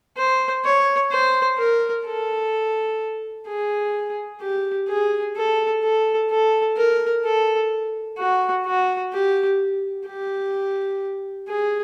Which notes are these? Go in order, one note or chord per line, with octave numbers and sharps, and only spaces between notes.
C5
C#5
C5
A#4
A4
G#4
G4
G#4
A4
A4
A4
A#4
A4
F#4
F#4
G4
G4
G#4